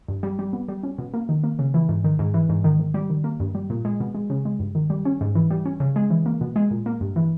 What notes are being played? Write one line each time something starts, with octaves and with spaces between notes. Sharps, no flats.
G2
G3
G3
B3
G3
C#4
B2
A#3
D#3
A#3
C#3
E3
G#2
D#3
G#2
E3
G#2
D#3
D#3
G3
D#3
A#3
G2
G3
A#2
G#3
B2
G#3
C#3
G#3
G2
D#3
G3
C#4
G#2
E3
G3
C#4
C#3
G#3
E3
A#3
B2
G#3
A#2
A#3
G2
E3